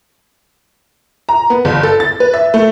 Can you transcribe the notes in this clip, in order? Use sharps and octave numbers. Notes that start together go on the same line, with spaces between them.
A#5
B3
G1
A4
A6
B4
E5
A3